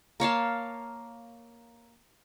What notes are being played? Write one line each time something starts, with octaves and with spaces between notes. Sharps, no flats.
A#3 C#5 F5 A5